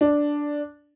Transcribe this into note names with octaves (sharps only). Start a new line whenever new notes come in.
D4